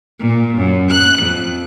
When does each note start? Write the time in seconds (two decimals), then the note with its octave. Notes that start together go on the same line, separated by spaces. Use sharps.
0.20 A#2
0.56 F#2
0.90 F#6
1.19 F2